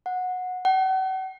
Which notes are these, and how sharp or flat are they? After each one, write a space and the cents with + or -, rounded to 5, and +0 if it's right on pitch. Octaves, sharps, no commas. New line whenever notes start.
F#5 -15
F#5 +40